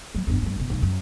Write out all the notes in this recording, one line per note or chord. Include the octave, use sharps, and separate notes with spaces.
F#3 A#3
G1 E2
G2 G3
F#1 B2
B1 C#3
F#2